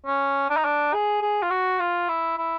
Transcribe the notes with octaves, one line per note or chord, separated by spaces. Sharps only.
C#4
D4
D#4
D4
G#4
G#4
F4
F#4
F4
E4
E4